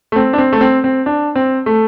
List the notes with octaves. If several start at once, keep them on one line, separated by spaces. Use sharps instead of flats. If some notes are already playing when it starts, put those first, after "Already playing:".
A3
C4
D4
C4
A3
C4
C4
D4
C4
A3